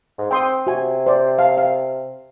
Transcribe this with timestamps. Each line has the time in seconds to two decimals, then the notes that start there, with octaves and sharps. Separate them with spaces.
0.18 G#2
0.31 C4 G5 C6 D#6
0.67 C3 F#4 G#5
1.06 C5 D5
1.39 F5 A5
1.57 F5